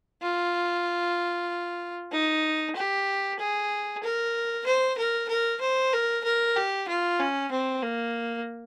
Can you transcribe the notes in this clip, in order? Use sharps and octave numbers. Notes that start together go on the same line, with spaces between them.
F4
D#4
G4
G#4
A#4
C5
A#4
A#4
C5
A#4
A#4
G4
F4
C#4
C4
A#3